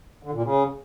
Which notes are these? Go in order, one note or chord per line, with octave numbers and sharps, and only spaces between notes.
D3
A#2
C#3